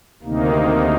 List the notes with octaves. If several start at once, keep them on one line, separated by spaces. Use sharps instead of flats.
D2 C3 D#3 A#3 D#4